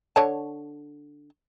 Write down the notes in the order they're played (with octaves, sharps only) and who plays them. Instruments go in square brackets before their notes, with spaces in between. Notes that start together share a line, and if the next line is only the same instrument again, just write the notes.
[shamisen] D3 C#5 A5